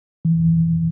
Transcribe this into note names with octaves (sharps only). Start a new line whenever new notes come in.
E3